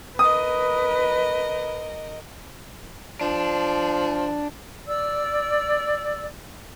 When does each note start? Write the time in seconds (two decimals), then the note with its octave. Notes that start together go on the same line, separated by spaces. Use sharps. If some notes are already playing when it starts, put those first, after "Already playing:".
0.19 A#4 B4 D#5 D#6
3.21 F3 D4
4.87 D5 E6